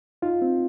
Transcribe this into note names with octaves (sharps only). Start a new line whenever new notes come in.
D#4 F4
C4